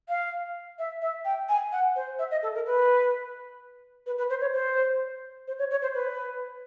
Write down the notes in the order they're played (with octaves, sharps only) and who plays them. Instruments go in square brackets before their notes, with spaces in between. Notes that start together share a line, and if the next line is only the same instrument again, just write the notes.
[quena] F5
E5
E5
G5
G#5
F#5
C5
E5
D#5
A4
A#4
B4
B4
B4
C5
C#5
C5
C5
C#5
C#5
C5
B4